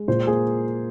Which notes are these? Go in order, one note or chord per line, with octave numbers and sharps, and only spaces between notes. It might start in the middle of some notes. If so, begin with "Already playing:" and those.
Already playing: G#3
A#2 C5
A#3 G#4